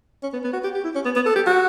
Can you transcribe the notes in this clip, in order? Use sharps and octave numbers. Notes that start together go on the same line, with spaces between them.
C#4
B3
B3
F#4
G4
G4
E4
C#4
B3
B3
A4
G4
F#4